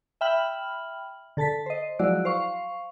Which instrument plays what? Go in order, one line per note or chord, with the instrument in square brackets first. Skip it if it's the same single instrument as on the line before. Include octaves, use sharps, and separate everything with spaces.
[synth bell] E5 G5 B5 F6 F#7
D3 A4 A5 A6 B6
C5 D#5
F3 F#3 G#3 E4 F#4 D5
C5 F5 C#6